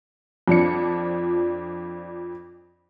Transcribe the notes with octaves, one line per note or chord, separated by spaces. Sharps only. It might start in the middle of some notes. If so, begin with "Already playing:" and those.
F2 F3 D4 C#7